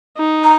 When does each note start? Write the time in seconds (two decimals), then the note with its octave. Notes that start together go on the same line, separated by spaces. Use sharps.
0.17 D#4
0.44 A#5